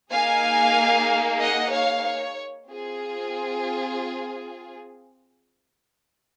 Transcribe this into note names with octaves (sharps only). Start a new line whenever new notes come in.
A#3 D#4 G#4 F5 G#5
D#5 F#5
C#5 F5
C#5
C4 F4 G#4